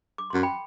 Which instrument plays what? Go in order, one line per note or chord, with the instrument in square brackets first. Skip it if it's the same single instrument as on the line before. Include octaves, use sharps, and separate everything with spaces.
[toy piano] D6
[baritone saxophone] F#2 [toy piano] C6
[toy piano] G5 B5